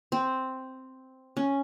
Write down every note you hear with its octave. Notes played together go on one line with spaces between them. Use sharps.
C4
C#4